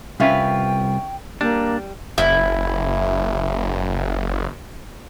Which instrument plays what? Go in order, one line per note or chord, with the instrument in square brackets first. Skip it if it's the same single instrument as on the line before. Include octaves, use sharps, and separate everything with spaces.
[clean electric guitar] C2 F4 B4 [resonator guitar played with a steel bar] C#4 E5 F5 [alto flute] G5
[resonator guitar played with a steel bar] G3 [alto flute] A#3 [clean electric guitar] D4
[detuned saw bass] F#1 [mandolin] E4